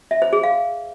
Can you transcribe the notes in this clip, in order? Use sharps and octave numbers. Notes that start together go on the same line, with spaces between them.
E5
C5
G#4
F5